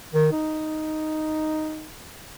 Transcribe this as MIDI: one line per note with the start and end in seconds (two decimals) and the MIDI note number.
0.14 0.28 51
0.32 1.90 63